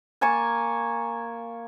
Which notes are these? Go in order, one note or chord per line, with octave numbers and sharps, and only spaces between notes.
A#3 G#5 A5 C#6